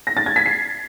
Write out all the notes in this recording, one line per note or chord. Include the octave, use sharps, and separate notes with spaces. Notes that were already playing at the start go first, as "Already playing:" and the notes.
A#6
A6
G#6
B6
C7